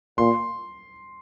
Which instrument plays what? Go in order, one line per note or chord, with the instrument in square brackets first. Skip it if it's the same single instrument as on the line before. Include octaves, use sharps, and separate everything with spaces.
[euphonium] A#2 [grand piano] C6